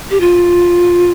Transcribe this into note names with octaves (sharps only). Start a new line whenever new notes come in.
G4
F4